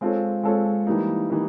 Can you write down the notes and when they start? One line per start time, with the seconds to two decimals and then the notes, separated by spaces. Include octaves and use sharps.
0.01 G#3 C4 F4 A4 C#5
0.43 G#3 C4 F4 A4 C#5
0.87 E3 G3 A#3 D#4
1.30 E3 G3 A#3 D#4